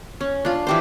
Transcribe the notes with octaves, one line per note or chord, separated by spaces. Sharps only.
C#4
D4 F4
E3 G4 C5